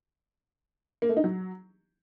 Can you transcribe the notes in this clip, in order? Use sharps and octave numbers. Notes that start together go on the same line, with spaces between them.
A#3
A3
D#4
F#3